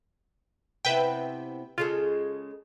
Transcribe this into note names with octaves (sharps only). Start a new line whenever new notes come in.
C3 B3 E4 B4 E5 G5
C#3 G#3 F4 A4